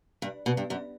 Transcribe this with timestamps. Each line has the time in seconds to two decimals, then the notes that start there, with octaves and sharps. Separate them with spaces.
0.22 G2
0.46 B2
0.57 G2
0.70 F#2